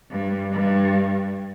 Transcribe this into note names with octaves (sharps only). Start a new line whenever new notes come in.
G2
G2